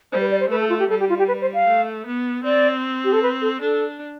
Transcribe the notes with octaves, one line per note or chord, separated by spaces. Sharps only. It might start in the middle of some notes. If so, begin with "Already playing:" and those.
G3 C5
B4
D5
C5
A3 B4
A4
F4
G4
G3 A4
G4
F4
G4
B4
C5
F5
A3
B3
C4 D5
G4
A4
B4
A4
D4 A4